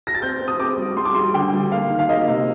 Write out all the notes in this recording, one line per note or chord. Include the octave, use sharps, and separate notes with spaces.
A#6
A6
C4 G6
C4
D#6
C4 D6
G3
G3 C6
D6
G3 C6
D3 G5
G3
A#3 F5
D#3
F5
A#3 D#5
C3